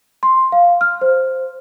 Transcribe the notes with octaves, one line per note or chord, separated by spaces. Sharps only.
C6
F5
F6
C5